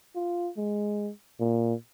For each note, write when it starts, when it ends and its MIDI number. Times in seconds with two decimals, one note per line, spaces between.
0.15 0.49 65
0.57 1.10 56
1.40 1.74 46